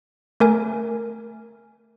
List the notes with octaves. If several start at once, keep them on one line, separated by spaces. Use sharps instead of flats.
A3 A#4 G#5